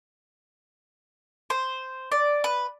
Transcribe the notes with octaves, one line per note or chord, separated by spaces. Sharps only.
C5
D5
B4